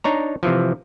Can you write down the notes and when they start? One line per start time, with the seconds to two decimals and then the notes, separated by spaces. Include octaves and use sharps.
0.04 D4 D#4 C#5 A#5
0.43 C3 E3 F3